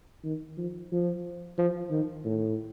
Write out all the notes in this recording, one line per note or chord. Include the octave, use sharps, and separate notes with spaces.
D#3
F3
F3
F3
D#3
A2